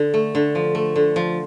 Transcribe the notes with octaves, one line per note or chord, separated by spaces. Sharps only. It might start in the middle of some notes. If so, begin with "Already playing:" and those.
Already playing: D3
A3
D3
F3
A3
D3
F3